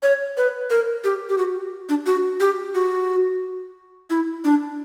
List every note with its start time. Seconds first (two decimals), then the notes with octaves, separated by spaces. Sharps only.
0.03 C#5
0.37 B4
0.70 A#4
1.04 G4
1.29 G4
1.38 F#4
1.89 D4
2.06 F#4
2.40 G4
2.75 F#4
4.10 E4
4.44 D4